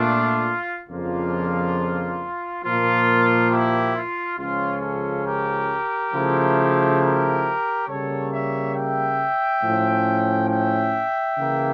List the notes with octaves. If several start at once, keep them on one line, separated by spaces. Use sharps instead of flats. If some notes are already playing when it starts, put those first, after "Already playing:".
Already playing: A#2 A3 D4 F4
F2 C#3 F3 A#3 D4 F4
A#2 F3 A#3 F4
E4 G4
F4
C#2 C#3 F3 C#4 F4
F4 A4
G4 A#4
C#3 F3 A3 E4
G4 A#4
C#3 G3 A#3 A4 C#5
C#5 E5
E5 G5
A2 F3 C#4
E5 G5
C#3 E3 A#3 E4